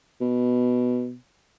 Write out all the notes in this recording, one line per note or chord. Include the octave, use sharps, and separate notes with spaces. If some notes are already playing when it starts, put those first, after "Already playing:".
B2